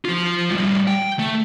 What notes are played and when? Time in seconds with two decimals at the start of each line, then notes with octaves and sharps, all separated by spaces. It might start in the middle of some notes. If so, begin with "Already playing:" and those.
0.05 F3 F4
0.51 A2 G3
0.88 G5
1.19 A3